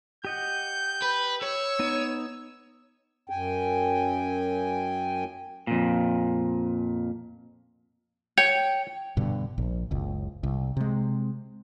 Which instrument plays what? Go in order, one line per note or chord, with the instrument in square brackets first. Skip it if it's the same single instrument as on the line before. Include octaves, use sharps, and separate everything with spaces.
[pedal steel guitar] G4 D#5 F#5 [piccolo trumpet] G6
[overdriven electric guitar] B4
[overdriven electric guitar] C#5 [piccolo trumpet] E6
[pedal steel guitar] B3 D#4
[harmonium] F#2 G5 G#5
[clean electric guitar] F2 A#2
[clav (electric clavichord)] C#5 [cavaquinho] G5
[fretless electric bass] G2 B2 D3
A#1
F#1 C#2
C2
C3 G#3